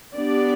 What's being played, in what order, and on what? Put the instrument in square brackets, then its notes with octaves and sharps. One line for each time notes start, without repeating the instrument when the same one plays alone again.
[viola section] B3 D4 G4 D5